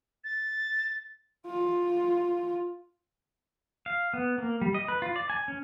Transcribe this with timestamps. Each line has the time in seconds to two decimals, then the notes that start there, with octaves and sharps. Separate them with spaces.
0.24 A6
1.47 F4
3.86 F5
4.14 B3
4.38 A#3
4.61 G3
4.74 D#5
4.88 B4
5.02 F4
5.16 D5
5.30 G#5
5.48 C#4